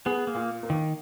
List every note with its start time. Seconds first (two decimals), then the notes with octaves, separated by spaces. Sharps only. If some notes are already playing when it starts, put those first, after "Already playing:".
0.06 B3 G#4
0.27 A#3
0.34 A#2
0.63 A#3
0.70 D#3